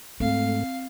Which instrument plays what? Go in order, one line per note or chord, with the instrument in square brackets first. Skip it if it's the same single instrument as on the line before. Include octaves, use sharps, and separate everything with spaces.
[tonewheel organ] G#2 A3 [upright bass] C4 [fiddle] F5